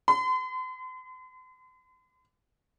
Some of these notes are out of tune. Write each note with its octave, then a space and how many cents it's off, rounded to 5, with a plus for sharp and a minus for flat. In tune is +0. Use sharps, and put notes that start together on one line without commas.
C6 -40